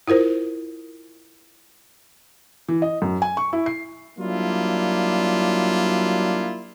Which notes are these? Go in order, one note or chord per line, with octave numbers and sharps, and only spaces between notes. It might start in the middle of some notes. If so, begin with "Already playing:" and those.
E4 F4 A#4 C5
E3
D#5
F#2
G#5
C#6
E4
C7
F#3 G3 A#3 D4 E4 F4